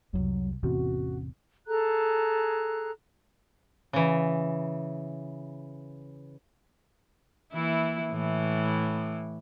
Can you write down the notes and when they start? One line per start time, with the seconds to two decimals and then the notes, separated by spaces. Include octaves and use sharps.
0.13 C2 F2 F#3
0.63 A1 E2 C3 C#4 F#4
1.67 G#4 A4 A#5 F#6
3.93 C#3 E3
7.53 E3 A#3 E4
8.11 A2 E3